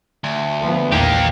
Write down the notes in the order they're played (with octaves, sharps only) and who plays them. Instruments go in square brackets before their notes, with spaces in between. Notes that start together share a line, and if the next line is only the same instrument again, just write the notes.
[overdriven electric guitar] D2
[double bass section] F3 B3
[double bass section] A#1 E2 [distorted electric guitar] A#3 G4